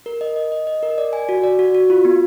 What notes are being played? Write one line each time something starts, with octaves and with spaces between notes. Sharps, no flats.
A#4
D#5
D#5
D#5
D#5
A#4
D5
G#5
F#4
D5
F#4
F#4
F4
B3